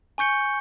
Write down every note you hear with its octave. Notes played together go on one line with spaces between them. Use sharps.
G#5 C#6 G6 C#7 G7